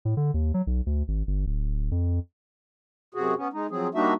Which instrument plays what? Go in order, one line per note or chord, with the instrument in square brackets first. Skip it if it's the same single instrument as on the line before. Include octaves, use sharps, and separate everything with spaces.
[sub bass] A2
D3
D#2
F#3
B1
D2
G#1
G1
D1
F2
[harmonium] F#2 C3 F#4 G#4
B3 C#4
G#3 D#4
F3 F#3 C4 G#4
G3 A#3 D4 D#4 F#4 E5